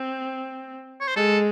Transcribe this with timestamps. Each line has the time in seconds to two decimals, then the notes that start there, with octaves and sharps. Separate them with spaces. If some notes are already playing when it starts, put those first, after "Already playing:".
Already playing: C4
1.01 C#5
1.08 C5
1.16 G#3 A4